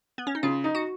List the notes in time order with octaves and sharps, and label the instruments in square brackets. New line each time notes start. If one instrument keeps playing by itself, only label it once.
[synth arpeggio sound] B3
C#4
D#4
[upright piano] C#3 [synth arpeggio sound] F4
[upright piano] D#4
[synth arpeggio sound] F#4